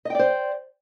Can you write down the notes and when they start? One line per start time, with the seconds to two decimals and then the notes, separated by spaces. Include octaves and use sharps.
0.05 D#5
0.10 G5
0.15 D5
0.19 C5